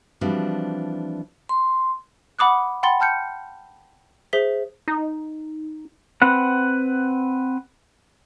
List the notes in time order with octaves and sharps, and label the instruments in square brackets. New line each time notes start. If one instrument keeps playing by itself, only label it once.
[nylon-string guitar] E3 F3 G3 C4 D4 F#4
[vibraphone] C6
[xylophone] F#5 B5 D6 D#6 F#6
F#5 G5 B5 C6 A6 G7
G5 A5 F6 G6 C#7
G#4 C5 E5 B6 G7
[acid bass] D#4
[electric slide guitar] C4 B4 F#5